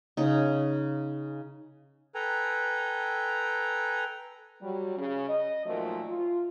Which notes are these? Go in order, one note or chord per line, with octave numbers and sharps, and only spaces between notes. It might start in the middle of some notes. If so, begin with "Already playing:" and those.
C#3 D#4
A4 B4 G5 G#5 A#5
F#3 G3
C#3
D#5
A#2 D#3 F3 F#3 A3
F4